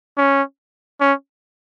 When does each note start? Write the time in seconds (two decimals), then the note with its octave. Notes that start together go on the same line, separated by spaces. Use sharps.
0.18 C#4
1.01 C#4